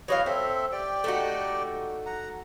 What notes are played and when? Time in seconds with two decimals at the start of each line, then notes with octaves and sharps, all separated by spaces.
0.08 E3 F#3 C#5 D#5 F5
0.26 C4 A4 C5 E5
0.72 G4 D5 G5
1.04 A3 D#4 F#4
2.06 F#5 A#5